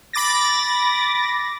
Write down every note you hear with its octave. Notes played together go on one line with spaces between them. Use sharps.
B5 D6 A6 A#6